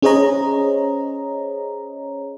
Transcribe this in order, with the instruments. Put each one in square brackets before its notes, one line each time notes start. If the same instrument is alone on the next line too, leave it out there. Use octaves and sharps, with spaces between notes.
[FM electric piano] C#4 G#4 C5 C#5 D#5 A#5